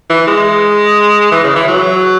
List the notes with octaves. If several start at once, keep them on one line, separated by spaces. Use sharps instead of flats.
E3
G#3
E3
C#3
E3
F#3